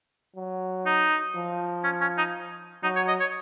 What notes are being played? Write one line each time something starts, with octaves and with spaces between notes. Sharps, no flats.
F#3
D#4
F3
C#4
C#4
D#4
F#3 D#4
C#5
D#5
C#5